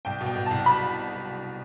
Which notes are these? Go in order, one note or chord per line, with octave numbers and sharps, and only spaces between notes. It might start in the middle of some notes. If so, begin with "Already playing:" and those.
C2 G5
B2
G5
B2
C2 A5
B5